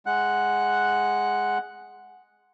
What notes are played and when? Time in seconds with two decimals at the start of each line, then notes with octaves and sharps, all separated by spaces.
0.06 G#3 F#5 F#6